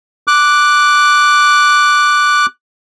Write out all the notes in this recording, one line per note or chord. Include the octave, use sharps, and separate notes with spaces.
D6 F#6